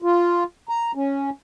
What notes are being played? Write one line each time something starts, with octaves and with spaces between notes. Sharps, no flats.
F4
A#5
C#4